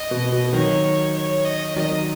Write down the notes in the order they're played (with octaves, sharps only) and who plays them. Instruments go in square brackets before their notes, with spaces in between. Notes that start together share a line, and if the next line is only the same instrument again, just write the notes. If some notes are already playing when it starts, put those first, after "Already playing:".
Already playing: [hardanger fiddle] D#5
[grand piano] B2
B2
[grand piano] D#3 F#3 [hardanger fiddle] C#5
[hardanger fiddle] C#5
D#5
[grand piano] D#3 F#3 [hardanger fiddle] D#5